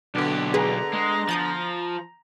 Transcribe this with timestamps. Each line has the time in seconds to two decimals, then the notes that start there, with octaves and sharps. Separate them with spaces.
0.15 B1 D3 B3 D4 G4
0.54 G#4 B4 A#5
0.93 G#3
1.29 F3 D#6 G6 A6